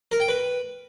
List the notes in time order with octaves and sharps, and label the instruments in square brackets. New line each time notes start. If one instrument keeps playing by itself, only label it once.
[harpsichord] A#4
G5
B4